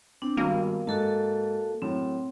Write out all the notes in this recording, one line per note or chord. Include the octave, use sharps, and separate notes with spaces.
C4 D4
G#1 G2 A#3 B3
G#2 F#4 A4 A5
F#2 A2 C4